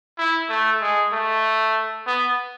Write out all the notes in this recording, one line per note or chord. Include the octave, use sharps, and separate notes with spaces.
E4
A3
G#3
A3
B3